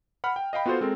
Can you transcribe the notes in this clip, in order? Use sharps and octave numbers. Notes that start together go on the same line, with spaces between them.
F#5 B5 F6
G5
D#5 F5 G5 B5
B3 F4 F#4 A4 C5
G#3 C4 A4 A#4